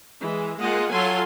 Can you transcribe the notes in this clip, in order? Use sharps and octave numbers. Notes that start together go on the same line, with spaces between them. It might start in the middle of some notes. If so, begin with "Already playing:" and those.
E3 G#3
G#3 A#3 F4 D#5 F#5
F#3 F4 A4 G#5 C6